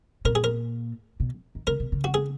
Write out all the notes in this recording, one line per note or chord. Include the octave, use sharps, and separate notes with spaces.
A#2 A#4
G#4
A#4
B2
D#3
C#3 A#4
B2
C#3
F#4
G#4